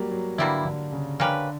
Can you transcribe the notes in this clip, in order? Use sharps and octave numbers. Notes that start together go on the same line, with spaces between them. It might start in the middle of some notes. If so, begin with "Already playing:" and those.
Already playing: F#3 G3 A#3
F#3
B2 D3 G3 A#3 E4
D3
C#3
D3 A#3 C#4 G4 B4